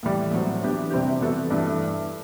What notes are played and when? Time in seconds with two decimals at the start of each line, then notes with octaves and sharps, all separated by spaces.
0.03 A2 E3 G3
0.31 A2 F#3 C4
0.62 E3 B3 D4 G4
0.91 C3 G3 C4 G4
1.21 E3 B3 F#4 A4
1.50 G2 E3 A3